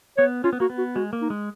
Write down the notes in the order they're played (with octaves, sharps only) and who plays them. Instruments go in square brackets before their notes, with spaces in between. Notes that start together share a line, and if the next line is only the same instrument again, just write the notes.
[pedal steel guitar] B3 [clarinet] C#5
[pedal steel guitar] C#4 [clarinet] F4
[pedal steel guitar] B3
[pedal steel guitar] A#3 [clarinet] F#4
[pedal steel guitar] B3
[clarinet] F#4
[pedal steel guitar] G#3 [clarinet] F#4
[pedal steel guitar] A#3
[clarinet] D#4
[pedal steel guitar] G#3